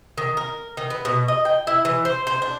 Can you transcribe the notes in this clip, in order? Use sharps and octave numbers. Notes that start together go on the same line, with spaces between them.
D#3
A#4
D#3
B3
B2
D#5
G5
E4
E3
C5
C5
D4